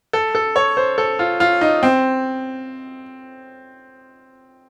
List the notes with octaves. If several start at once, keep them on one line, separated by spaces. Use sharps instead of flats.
A4
A4
C#5
C5
A4
F4
F4
D#4
C4